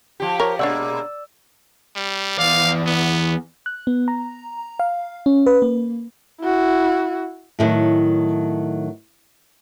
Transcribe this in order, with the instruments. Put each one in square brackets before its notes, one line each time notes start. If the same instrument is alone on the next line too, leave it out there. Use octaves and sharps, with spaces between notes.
[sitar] F3 G4
[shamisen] A#4 C#5
[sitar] B2 G#3 A#3 [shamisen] D4 C#5 F#5 [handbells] D5 E6
[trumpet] G3
[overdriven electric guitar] E2 D5 [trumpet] F5
[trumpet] B3
[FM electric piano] F#6
B3
A#5
F5
C#4
B4
A#3
[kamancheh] E4 F#4
[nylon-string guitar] A2 D3 D#3 F#3